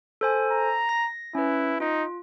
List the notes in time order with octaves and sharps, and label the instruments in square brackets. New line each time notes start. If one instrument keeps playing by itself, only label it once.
[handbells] A4 C5 G#5
[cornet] A#5
[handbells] A#6
[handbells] C#4 B4 [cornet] E4
[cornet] D#4 [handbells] F4